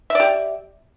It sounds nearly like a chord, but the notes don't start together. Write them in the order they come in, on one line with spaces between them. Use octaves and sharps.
E5 D5 G4